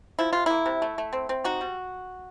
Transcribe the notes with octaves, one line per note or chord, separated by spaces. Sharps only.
F3 E4
C3 F4
A#3 E4
C3
A3
A3
C4
C4
D#4 F#4
G3